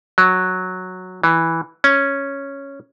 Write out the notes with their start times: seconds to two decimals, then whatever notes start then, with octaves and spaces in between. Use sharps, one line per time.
0.18 F#3
1.23 E3
1.84 C#4